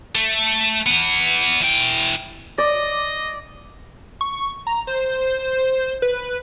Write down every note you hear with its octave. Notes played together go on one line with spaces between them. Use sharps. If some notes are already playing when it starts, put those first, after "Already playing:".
A3
E3 B3
E3 G5
D5 D#5
C#6
A#5
C5
B4